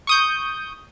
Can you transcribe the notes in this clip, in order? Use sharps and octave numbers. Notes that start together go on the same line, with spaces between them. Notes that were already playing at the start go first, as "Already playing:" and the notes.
C#6 D#6 G6